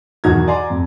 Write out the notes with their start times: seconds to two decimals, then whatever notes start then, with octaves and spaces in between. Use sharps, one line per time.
0.24 B1 E2 D#3 F#4 A#5 G#6
0.48 D5 F#5 G#5 A#5 C6
0.70 F2